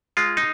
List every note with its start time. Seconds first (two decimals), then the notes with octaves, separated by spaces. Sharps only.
0.17 G#3 F4
0.37 D#4